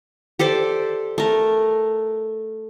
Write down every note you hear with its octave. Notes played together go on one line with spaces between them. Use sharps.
G4 A4 C5 D5
A3 A#4